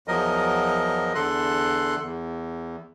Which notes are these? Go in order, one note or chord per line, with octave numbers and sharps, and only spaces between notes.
E2 F3 F#3 A#4 D#5
E2 D3 A4 C6 F#6
E2